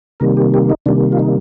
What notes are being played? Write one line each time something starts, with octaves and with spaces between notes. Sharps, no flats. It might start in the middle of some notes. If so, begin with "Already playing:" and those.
C3 D#3 G3 A#3 A#4
G4
G4
D#4
C3 D#3 G3 A#3 D4
F4
D#4